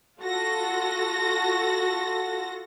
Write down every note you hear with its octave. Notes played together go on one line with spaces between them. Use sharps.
F4 F#4 A4 A#6